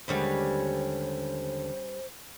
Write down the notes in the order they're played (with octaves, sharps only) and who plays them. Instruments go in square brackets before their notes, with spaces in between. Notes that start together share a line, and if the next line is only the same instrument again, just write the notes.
[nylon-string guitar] D#2 D3 G#3 [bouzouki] G3 C#4 B4 [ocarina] C5